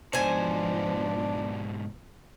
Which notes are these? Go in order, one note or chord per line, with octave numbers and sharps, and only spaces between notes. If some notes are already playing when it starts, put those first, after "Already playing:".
G#2 B2 F3 B3 D4 C5 G#5